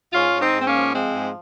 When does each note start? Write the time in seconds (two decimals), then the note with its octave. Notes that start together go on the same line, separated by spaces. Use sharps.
0.13 G#2 C#4 F4
0.33 G#2
0.40 C4 D#4
0.53 G#2
0.61 C4
0.67 A#3 C#4
0.73 F3
0.93 F3 G#3 C4
1.14 G#2